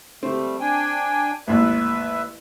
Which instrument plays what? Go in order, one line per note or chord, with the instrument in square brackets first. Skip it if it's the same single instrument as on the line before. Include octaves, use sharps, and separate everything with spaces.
[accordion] G3 A3 [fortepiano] C4
[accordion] D4 G5 G#5
[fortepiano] A1 D#2 G#2 [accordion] B4 E5